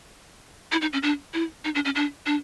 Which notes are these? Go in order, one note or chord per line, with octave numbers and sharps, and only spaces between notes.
E4
D#4
C#4
D4
E4
D#4
D4
C#4
D4
D4